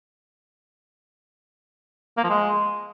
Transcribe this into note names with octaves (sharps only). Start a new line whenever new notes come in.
A#3
F3
G#3